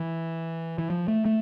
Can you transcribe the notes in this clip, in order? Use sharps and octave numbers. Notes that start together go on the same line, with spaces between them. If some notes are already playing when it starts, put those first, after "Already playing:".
Already playing: E3
E3
F3
A3
A3